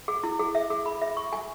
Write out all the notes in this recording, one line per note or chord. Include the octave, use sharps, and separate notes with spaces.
G#4
E4
G#4
E5
G#4
B5
E5
C#6
G#5